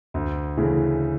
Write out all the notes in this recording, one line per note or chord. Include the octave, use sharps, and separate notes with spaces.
D2
C#3 E3 A3